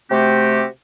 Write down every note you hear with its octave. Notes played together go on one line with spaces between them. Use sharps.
C3 A3 C4 F#4 G4